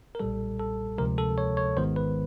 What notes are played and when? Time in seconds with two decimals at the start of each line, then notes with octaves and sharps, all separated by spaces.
0.15 A#4
0.20 B1 A#2 G3 A4
0.59 A4
0.98 D2 C3 F3 G#3 A#4
1.18 A4
1.38 C#5
1.57 C#5
1.77 G#1 G#2 D#3 G#3 B3 C5
1.96 B4